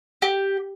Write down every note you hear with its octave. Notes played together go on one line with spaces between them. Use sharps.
G4